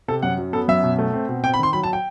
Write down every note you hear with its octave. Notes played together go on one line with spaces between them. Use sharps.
C3 A4
F#2 F#5
F#3
B3 A4
F#2 E5
B2
A3
C4
B2
C4 G5
B5
D#3 C6
F#3 B5
A5
G5